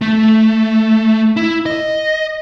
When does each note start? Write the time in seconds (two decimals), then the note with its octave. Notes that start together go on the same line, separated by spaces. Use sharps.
0.01 A3
1.37 E4
1.66 D#5